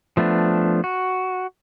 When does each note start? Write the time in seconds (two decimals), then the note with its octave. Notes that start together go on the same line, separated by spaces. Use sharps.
0.17 F3 A3 B3 D4
0.84 F#4